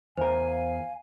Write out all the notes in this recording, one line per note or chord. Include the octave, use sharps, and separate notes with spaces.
E2 A#4 C5 F5 G#5